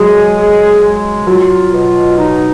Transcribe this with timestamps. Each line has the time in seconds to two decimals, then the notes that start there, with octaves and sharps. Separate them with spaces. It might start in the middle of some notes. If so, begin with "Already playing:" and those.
Already playing: F#3 G#3 G#4
0.37 G#4
0.83 G#3
1.27 F#3 F4
1.72 B2
2.17 D#4